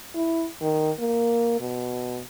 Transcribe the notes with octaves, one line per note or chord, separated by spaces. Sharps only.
E4
D#3
A#3
B2